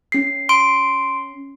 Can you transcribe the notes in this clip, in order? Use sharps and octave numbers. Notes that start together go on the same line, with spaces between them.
C#4 C7
C6 D7